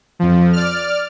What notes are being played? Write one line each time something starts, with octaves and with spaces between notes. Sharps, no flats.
F2 F3
D5 F6